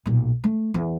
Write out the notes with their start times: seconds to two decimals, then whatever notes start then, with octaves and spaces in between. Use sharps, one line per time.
0.06 B1 A#2
0.44 A3
0.74 E2